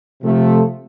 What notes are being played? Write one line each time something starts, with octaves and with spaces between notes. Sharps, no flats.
C3 F3 A3